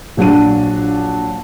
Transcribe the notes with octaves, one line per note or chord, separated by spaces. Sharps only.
A#1 F#3 D4 D#7